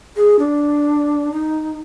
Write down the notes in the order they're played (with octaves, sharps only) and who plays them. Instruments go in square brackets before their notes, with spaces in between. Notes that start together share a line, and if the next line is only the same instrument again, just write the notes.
[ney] G#4
D4
D#4